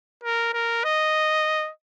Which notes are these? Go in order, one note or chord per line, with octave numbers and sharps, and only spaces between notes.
A#4
A#4
D#5